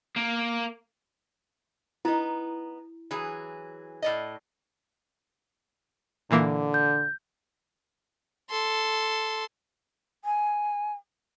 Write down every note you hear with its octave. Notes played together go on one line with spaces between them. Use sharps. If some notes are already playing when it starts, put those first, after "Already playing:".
A#3
B3 D#4 E4
E3 F#3 G#4
A2 D5 D#5
A#2 D3 E3 A#3
G6
A4 C6
G#5